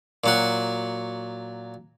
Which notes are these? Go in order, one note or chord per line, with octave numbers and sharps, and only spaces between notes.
A#2 F#3 F#4